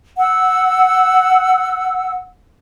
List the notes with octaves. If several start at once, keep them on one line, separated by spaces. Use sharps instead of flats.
F#5 E6